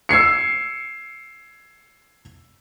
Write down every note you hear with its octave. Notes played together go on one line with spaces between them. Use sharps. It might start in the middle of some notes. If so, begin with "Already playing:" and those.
E6 G#6 C7 C#7